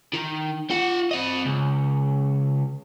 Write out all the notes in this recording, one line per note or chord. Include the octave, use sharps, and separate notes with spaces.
D#3
F4 F#5
C4 D#5
C#2